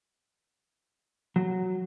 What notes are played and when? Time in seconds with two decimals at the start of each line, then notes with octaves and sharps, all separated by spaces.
1.36 F#3